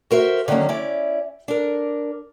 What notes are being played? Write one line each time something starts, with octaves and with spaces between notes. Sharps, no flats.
F#4 A#4 C5 E5
D3 D#3 F#3 A#3 C#4
C#4 E4 D5
D4 A#4